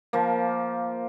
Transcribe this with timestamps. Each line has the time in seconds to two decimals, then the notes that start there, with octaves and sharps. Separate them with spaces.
0.13 F3 A#3